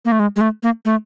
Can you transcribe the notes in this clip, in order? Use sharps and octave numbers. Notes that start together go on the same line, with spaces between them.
A#3
A3
G#3
G#3
A3
A#3
A3